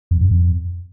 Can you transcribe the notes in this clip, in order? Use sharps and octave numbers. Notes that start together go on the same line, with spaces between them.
F2
F#2
F2